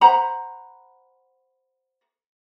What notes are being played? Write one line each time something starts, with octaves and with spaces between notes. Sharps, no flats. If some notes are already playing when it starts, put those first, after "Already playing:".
C5 F#5 A#5 B5